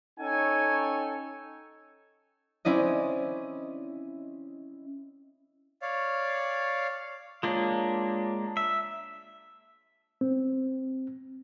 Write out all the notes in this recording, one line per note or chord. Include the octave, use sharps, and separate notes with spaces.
C#4 D#4 A4 C#5 G5 G#5
C4 C#4 E4 D5 D#5
C#5 D5 F5
G#3 A#3 D4 F4 C#5
E5
C4